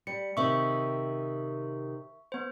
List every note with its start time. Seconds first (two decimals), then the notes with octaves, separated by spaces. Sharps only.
0.07 G3 C#7
0.37 C3 D#3 E5 C#6
2.32 B3 C5